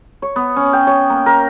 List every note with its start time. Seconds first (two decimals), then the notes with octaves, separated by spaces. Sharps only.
0.22 C#5
0.36 B3
0.56 C#4
0.73 G5
0.87 C#5
1.09 A#3
1.26 A#4